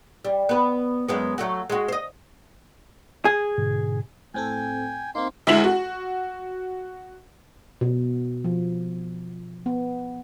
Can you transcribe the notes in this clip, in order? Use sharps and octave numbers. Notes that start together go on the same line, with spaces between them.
G3
B3 B4
F#2 G#3 B3
F#3 A3 F#4
G#3 F#4
C5 D#5
G#4
G#2 B2 D3
A2 C4 A4 G5 G#5
A#3 C4 D#4 C6
D2 G#3 E4 E5 F#7
F#4
B2
F3
B3